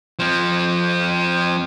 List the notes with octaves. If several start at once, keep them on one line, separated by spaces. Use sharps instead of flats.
F3 C4